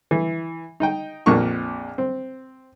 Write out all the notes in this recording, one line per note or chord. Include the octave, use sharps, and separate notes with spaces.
E3
D#4 D#5 G5
A#1 F2 A#2 D4 A#4 C#6
C4